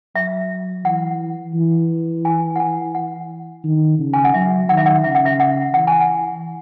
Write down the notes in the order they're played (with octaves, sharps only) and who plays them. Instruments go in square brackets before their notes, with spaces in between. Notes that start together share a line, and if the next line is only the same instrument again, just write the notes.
[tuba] F#3 [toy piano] E5
[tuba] E3 [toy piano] F#5
[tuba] E3
[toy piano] G#5
F#5
G#5
F#5
[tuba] D#3
C#3
[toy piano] G#5
F#5
[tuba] F#3 [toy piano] E5
[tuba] D#3 [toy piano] F#5
[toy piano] E5
F#5
[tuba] C#3 [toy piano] E5
[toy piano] F#5
E5
F#5
[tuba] E3 [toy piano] F#5
[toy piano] G#5
F#5